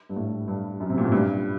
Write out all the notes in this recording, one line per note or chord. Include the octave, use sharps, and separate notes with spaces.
G2
A2
G2
F#2
C3
A#2
A2
G2